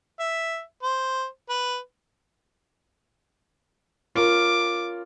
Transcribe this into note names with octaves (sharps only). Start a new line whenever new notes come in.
E5
C5
B4
C#4 F4 A#4 D6